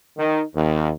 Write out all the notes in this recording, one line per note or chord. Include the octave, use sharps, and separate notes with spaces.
D#3
D#2